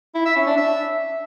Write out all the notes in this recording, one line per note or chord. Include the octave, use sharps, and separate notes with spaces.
E4
E5
C#4
D4
E5